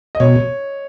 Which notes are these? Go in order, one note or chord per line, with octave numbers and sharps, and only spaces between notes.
D#5
B2 C#5